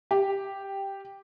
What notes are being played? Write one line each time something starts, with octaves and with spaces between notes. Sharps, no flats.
G4